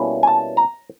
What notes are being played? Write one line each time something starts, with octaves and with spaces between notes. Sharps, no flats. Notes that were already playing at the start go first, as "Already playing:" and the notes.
Already playing: B2 G3 A#3 C#4 E4
G#5
A5
A#5